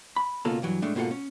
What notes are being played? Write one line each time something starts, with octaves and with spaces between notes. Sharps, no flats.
B5
C#2 B2 A#3 C#4 F4 A4
G2 E3 F#3
A2 G#3 A3 D4
G#2 B2 A#3 F4 A4 F#5
C#4